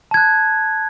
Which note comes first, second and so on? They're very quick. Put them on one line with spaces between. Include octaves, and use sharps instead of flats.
A5 G#6 F#6